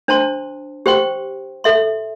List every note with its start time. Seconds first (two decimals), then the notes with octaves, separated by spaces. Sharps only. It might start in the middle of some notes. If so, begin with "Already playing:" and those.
0.08 D4 C5 A5 C6
0.86 G4 C5 G5 C6
1.64 A4 E5 C6